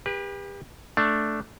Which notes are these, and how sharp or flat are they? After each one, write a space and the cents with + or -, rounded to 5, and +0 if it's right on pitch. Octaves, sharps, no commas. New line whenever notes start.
G4 +35 B4 -25
A3 +0 D4 +0